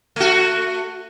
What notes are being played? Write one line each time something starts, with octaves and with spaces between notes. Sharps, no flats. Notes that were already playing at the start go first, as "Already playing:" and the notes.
A3 F#4